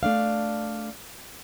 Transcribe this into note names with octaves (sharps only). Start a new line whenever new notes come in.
A3 D4 F5